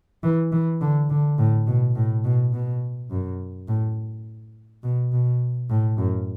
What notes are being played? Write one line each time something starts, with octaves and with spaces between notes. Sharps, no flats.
E3
E3
D3
D3
A2
B2
A2
B2
B2
F#2
A2
B2
B2
A2
F#2